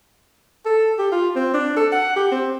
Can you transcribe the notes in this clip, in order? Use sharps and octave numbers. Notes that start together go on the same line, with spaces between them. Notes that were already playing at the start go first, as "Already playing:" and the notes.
A4
G4
F4
C4
D4
A4
F#5
G4
C4